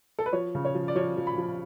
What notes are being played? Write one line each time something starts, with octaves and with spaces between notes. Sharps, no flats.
A4
B4
F3 C#5
C#3
C#5
F3
D5
F3 C#5
F3
B5
F3